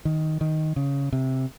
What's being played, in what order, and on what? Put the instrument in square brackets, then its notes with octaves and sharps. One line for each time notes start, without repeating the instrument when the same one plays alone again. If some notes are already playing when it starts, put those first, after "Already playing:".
[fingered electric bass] D#3
D#3
C#3
C3